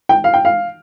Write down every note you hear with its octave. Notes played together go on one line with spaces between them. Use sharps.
G5
F5
G5
F5